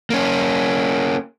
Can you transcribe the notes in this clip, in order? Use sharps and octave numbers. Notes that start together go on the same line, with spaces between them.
A#3 C#4